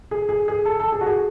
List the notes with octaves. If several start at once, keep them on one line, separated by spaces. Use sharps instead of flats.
G#4
G#4
G#4
A4
A4
G#4
F#4
G#4